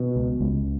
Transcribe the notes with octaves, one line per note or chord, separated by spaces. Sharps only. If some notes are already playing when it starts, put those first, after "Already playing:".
Already playing: B2
C#2
C#2